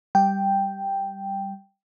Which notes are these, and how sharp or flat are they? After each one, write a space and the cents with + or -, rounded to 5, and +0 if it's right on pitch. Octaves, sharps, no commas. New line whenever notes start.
G3 +0 G5 +0